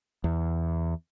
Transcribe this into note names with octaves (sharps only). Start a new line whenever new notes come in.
E2